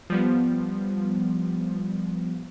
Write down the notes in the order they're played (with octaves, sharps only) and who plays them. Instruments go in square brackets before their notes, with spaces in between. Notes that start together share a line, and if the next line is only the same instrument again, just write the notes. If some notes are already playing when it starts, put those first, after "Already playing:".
[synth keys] F3 G3 B3